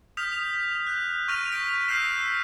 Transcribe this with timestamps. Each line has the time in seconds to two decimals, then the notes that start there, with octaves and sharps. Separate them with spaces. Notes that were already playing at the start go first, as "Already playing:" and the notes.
0.17 D#6 F6 G6 B6 F7
0.87 F#6 G6
1.28 C#6 F6 G6 A#6 D#7 F7
1.52 B6 D7 F7
1.88 E6 F6 G6 B6 C7 E7